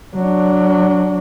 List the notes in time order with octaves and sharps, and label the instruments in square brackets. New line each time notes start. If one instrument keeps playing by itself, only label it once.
[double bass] F#3 D4